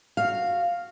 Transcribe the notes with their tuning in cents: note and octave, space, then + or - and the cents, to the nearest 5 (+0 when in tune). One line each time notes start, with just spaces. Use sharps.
F#4 -5 F5 +0